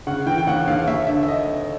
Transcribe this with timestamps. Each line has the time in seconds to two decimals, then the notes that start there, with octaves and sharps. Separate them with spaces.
0.07 C#3 F#5
0.26 E3 G5
0.38 G5
0.47 D#2 F#5
0.67 D#2 F5
0.87 D#2 E5
1.07 D3 E5
1.23 E5
1.28 D#5